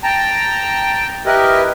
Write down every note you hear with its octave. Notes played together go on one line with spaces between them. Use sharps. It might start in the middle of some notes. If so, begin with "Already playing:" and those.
G5 A5 A#5
E4 G4 A#4 B4 D#5